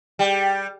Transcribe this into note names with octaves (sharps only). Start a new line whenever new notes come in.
G3 G5